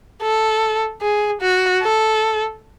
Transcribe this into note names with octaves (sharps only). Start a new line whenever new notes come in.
A4
G#4
F#4
A4